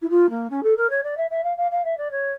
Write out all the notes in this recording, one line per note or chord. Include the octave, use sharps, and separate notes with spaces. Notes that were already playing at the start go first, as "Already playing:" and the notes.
E4
F4
A#3
C#4
A4
A#4
C#5
D5
E5
E5
F5
F5
F5
E5
D5
C#5